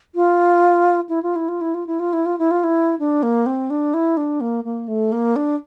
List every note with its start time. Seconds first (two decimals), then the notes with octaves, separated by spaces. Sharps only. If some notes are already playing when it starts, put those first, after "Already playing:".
0.15 F4
1.09 E4
1.23 F4
1.36 E4
1.48 F4
1.61 E4
1.74 F4
1.87 E4
2.00 F4
2.13 E4
2.26 F4
2.39 E4
2.51 F4
2.64 E4
2.99 D4
3.23 A#3
3.46 C4
3.70 D4
3.94 E4
4.17 D4
4.41 A#3
4.64 A#3
4.88 A3
5.12 A#3
5.36 D4